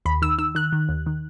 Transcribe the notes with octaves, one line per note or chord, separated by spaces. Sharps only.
D#2 B5
D#3 E6
D#3 E6
D#3 F#6
D#3
D#2
D#3